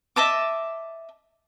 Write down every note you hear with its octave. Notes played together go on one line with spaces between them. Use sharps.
D#5 E5 A5 D6